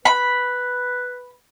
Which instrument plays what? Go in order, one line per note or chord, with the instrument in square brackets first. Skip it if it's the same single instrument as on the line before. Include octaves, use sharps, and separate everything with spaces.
[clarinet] B4 [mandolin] B5